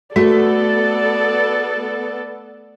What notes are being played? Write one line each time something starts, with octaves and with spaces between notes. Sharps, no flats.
A3 B3 F#4 A4 D5